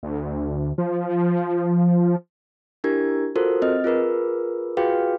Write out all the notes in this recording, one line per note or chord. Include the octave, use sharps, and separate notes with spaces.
D2
F3
D4 E4 G4 A#4 G#6
F4 F#4 A4 A#4 C5
C4 D#5 F6
F4 G#4 A#4 B4
F4 F#4 G#4 B4 F5 G5